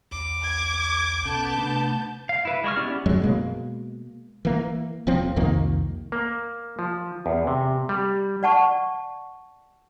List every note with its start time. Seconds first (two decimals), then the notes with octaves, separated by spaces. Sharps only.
0.11 B1 E2 D6
0.42 G#6
1.25 B2 B3 C#4 A4 A5 G6
1.58 C3 A3 D4
2.29 F5
2.45 E4 B4
2.64 G#3 G#4 C#6 F6
2.76 B3 C#4 E4 G4 D5
3.06 F#2 F#3 G#3
3.21 B2 G#3 A#3
4.45 E3 A#3
5.07 D#1 F3 C4
5.36 C2 F2 D#3 A#3
6.12 A#3
6.79 F3
7.26 E2
7.47 C3
7.89 G3
8.43 D5 F#5 A5 C#6